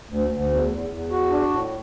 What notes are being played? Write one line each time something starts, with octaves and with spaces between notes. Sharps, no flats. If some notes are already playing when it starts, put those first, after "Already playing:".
D2
D2
E2
E2
E2
F#4
D4
A2